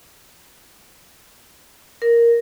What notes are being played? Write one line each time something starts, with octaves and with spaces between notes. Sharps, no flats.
A#4